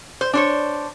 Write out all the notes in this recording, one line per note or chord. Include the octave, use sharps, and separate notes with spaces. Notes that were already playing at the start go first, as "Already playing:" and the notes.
C5
D4 C5 C#5